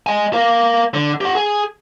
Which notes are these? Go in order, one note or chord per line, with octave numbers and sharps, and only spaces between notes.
D#5 G#5
A#4 F5
D3
G4 F#5
G#4 G#5